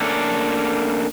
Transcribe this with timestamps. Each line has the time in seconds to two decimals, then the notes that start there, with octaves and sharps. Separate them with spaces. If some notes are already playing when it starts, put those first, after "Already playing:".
0.01 A3 A#3 C#4 D4 A4